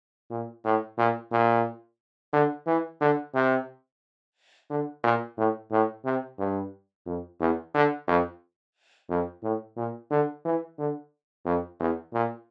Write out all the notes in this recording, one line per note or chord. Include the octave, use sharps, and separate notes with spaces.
A#2
A2
A#2
A#2
D3
E3
D3
C3
D3
A#2
A2
A2
C3
G2
F2
E2
D3
F2
F2
A2
A#2
D3
E3
D3
F2
E2
A#2